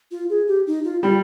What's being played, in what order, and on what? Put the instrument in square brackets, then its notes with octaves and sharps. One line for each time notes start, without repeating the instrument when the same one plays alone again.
[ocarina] F4
G#4
G4
D#4
F4
[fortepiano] G3 [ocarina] F4